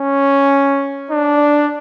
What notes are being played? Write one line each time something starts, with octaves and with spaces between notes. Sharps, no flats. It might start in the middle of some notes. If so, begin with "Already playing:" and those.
Already playing: C#4
D4